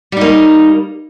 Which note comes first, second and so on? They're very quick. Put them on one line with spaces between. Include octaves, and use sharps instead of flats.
G3 D#4 A#3